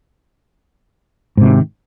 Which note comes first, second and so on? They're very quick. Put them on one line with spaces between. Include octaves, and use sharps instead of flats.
G#2 C3 F#3 D#3